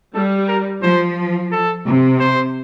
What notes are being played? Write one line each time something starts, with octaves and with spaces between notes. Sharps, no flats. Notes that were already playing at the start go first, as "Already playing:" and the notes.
G3 A4
A#4
F3 C5
A4
C3
C5